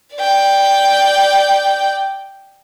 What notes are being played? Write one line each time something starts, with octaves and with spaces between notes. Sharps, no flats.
D5 G5